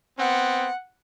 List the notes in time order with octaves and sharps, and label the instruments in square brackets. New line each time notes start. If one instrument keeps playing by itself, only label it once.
[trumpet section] B3 C4 [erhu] F#5